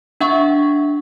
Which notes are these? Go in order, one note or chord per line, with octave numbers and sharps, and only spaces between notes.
D4 E5 F#5 C#6